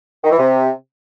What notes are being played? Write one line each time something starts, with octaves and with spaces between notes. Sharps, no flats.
D#3
E3
C3